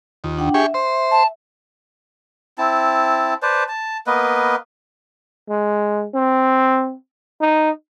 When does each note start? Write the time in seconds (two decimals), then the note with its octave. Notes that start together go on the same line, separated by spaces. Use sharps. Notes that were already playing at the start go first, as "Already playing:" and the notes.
0.24 D#2 F4
0.38 D4 F#5 G5
0.54 G4 G#4 E5 C#6
0.74 C5
1.11 A5
2.58 C4 E4 A5
3.43 B4 C5 D5 A5
3.68 A5
4.07 A#3 B3 B4 D#5
5.49 G#3
6.14 C4
7.41 D#4